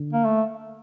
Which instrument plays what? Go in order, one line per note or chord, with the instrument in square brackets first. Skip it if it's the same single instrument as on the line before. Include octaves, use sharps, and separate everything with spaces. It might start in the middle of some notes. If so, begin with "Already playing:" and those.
Already playing: [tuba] D3
[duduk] A#3
A3